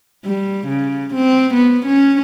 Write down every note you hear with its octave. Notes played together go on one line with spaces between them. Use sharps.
G3
C#3
C4
B3
C#4